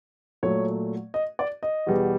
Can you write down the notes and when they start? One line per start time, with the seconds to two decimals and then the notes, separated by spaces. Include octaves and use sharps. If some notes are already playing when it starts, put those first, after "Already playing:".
0.43 A#2 F#3 A3 C#5
1.14 D#5
1.39 D5
1.63 D#5
1.87 E2 B2 G3 B3